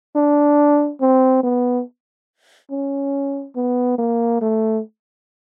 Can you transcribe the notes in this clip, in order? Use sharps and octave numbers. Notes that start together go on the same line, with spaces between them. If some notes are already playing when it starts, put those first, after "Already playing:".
D4
C4
B3
C#4
B3
A#3
A3